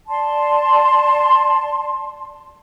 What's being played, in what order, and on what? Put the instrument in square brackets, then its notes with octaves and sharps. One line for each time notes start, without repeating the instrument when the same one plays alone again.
[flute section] D5 A5 C6